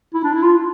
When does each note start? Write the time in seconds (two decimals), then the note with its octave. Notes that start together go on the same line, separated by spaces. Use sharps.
0.14 E4
0.23 D4
0.33 E4
0.43 F4